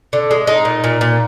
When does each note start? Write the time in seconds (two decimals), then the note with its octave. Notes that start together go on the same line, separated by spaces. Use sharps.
0.13 D3
0.31 G#3
0.47 G#3 D#4
0.65 A#2
0.84 A#2
1.01 A#2